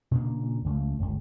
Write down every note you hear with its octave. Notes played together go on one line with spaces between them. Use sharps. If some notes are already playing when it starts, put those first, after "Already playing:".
A#2 C#3 A#3 D4
C#2 C#3 F3 A3
D1 G1 C#2